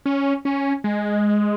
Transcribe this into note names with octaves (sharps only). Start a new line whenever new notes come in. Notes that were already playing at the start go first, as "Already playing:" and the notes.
C#4
C#4
G#3